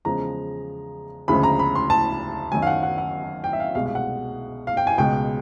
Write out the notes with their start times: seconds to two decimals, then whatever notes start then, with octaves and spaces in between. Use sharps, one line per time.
0.05 E2 C#3 F3 G#3 A#5
1.28 D2 C#3 F3 G#3 B5
1.43 A#5
1.59 B5
1.75 C6
1.90 A5
2.52 F#2 D#3 F#3 G#5
2.62 F5
2.67 F#5
2.83 F#5
2.98 F#5
3.44 G5
3.53 E5
3.60 F5
3.75 C2 B2 G#3 F5
3.86 F5
3.95 F#5
4.67 F5
4.77 G5
4.87 G#5
4.98 C#2 B2 G#3 G5